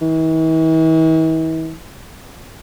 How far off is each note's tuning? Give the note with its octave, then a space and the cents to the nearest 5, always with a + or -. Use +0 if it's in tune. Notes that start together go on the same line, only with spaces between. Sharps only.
E3 -45